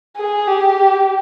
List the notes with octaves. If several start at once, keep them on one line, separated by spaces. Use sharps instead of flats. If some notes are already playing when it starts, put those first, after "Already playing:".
G#4
G4